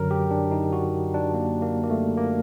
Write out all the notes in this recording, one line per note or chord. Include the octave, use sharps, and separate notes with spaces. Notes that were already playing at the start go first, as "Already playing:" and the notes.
Already playing: F#2 D3 F#3 A#4
G4
D4
D#4
F#4
D4
A#3
A#3
A#3
A3
A#3